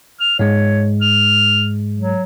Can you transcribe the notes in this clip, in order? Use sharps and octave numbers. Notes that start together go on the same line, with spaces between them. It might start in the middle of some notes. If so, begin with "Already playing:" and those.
F6
G#2 G#3 C#5
F6
F#3